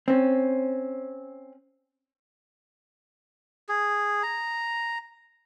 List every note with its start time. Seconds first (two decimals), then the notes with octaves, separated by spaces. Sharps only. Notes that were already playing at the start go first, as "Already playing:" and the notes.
0.08 C4 C#4
3.69 G#4
4.23 A#5